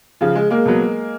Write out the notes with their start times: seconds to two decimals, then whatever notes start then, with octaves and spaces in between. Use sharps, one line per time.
0.21 C#3 F3
0.35 G#3
0.50 G#3 A#3
0.65 B2 F#3